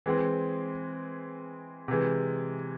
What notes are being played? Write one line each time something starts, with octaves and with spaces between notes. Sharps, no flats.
E3 G#3 C4
C3 E3 G#3